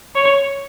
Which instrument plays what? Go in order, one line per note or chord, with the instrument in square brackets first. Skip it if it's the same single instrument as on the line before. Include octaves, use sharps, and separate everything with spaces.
[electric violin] C#5